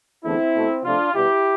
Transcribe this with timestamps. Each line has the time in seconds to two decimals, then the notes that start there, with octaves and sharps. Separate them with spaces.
0.24 E2 D3 A3 C4 E4
0.55 B2 A3
0.84 C3 F3 A3 D4 F4
1.14 B2 G3 B3 E4 G4